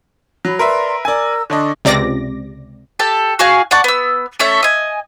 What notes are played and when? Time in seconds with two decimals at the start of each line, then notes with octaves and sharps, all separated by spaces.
0.45 F#3 B5
0.59 A#4 B4 D5 E5 A#5 C6
1.05 A#4 D5 G#5 E6
1.50 D3 D4 A4 D#5 C#6 D6
1.85 C#2 C3 D5 D6 A#6
2.99 G4 A4 A5
3.39 F#4 G#4 F5 G#5
3.71 D5 F#5 A5 C#6
3.84 B3 E6
4.39 A3 C#4 A4 E5
4.63 D#5 G#5